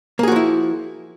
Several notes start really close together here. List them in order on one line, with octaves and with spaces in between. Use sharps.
A#3 G#4 F#4 F3 E4